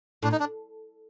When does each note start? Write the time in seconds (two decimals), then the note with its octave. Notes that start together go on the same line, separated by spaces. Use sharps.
0.23 A2 D4
0.32 D#4
0.40 D4